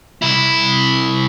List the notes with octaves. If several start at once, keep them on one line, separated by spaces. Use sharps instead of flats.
C2 E4